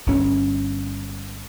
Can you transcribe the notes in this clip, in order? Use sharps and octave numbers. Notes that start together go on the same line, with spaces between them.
G1 C#4